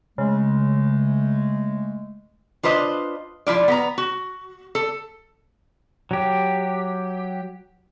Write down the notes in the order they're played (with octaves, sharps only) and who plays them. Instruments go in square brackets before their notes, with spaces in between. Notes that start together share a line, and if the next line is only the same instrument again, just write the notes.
[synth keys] C#3 [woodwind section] G#3 A3
[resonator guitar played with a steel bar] D4 F4 B4 C5 D#5
F3 E4 F4 D5
B3 A#5
F#4
A4
[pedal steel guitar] F#3 G4